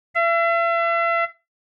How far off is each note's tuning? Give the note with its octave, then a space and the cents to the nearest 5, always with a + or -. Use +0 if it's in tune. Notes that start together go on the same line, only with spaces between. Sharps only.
E5 +40